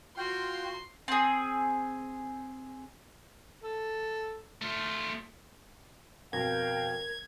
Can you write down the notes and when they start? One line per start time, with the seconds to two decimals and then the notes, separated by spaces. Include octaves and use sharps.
0.17 F4 F#4 G5 C6
1.08 C4 G#4
3.63 A4
4.61 A3 F4
6.33 F2 B2 A#4 F5 G5 G#6